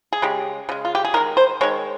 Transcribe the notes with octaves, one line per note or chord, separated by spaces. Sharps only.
G#4
C#3 G#3 G4
C#3 G#3
F4
G4
G#4
D#3 G#3 A#4
C5
D#3 G#3 C#5